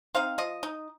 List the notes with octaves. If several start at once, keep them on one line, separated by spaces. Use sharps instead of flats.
C4 D#4 F5
F3 D#5
D#4